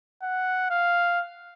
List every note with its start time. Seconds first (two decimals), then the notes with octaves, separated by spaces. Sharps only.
0.23 F#5
0.71 F5